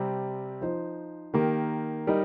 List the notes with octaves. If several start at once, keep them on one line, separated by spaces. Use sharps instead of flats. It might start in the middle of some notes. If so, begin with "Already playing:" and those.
Already playing: C3 G3 C4
F3 D#4 C5
D#3 A#3 G4
G3 D#4 A#4